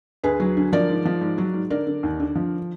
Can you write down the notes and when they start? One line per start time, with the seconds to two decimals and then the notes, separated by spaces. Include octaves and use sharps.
0.24 D2 G#4 B4
0.40 F#3
0.57 D3
0.72 F3 A#4 D5
0.89 G#2
1.05 F3
1.21 G#2
1.38 F#3
1.54 G#2
1.70 D3 A#4 D5
1.87 D3
2.03 D#2
2.20 D3
2.35 F3